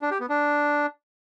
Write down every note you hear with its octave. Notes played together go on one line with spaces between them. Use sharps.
D4
G4
B3
D4